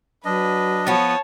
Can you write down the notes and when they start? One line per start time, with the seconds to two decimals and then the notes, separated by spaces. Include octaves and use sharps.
0.25 F#3 D4 B4 D#5
0.87 F3 B3 C#5 A5